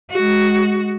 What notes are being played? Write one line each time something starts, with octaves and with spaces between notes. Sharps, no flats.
G#3 F#4